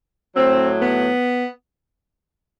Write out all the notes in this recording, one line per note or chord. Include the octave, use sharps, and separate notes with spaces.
A2 F#3 C4
B3